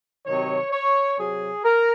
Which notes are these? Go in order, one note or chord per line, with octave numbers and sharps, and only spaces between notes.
C3 D#3 F#3 C#5
C#5
C3 F#3 G#4
A#4